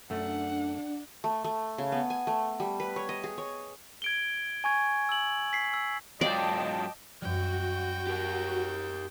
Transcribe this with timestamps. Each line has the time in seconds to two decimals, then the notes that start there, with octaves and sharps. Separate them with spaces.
0.10 F#2 A3 D4 F#5
1.24 A3
1.45 A3
1.78 C#3
1.92 B3
2.10 G#5
2.27 A3
2.60 G3
2.80 B4
2.96 C#5
3.09 D#5
3.24 G#4
3.38 C#5
4.02 G#6 D7 G7
4.64 G#5 C#6 G#6
5.09 E6 F#7
5.53 B6 C7
5.73 E6
6.21 G#2 F#3 F4 D5 D#5 G5 A5
7.22 F#2 G3 F#4 G5
8.07 G4 A#4